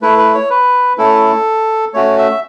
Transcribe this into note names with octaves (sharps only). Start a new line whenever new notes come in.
A3 E4 B4
B4
C#5
B4
A3 C#4 E4 A4
A3 C#4 F#4 C#5
E5